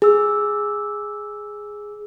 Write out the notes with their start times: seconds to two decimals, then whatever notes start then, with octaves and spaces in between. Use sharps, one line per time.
0.02 G#4 E6